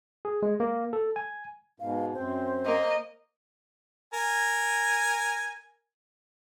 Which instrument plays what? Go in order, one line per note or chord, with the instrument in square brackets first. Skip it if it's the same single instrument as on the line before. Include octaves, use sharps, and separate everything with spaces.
[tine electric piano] G#4
G#3
A#3
A4
G#5
[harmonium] G#2 B2 [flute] F5
[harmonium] F#2 C4 [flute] C5
[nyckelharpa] A#3 A#4 [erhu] D#5
[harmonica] A#4 G#5